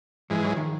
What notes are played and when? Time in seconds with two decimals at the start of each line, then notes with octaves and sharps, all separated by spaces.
0.30 G#2 E3 F3 G#3
0.44 F#3
0.57 D#3 F3